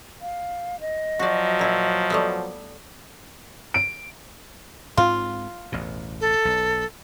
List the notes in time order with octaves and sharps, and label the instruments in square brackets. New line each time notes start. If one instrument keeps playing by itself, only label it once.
[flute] F5
D#5
[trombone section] F3 F#3 [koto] F#4 D5
[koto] A#2 E4
G3 A3 B3
[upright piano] D7
[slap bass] G#2 C4 [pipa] F4
[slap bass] A1 E2 B2
[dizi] A4
[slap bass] B1